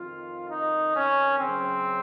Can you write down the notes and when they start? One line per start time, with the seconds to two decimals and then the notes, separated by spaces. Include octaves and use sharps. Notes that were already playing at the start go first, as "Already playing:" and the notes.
Already playing: F2 D#3 F4
0.49 D#4
0.94 C#4
1.39 F#2 C#3 C4